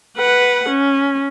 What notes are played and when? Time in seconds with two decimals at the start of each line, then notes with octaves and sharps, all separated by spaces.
0.18 B4 F#5
0.69 C#4